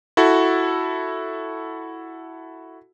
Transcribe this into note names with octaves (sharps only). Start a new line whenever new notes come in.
E4 F#4 A4